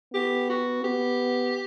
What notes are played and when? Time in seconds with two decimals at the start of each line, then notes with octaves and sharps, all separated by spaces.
0.14 B3 G4
0.50 F#4
0.84 B3 G4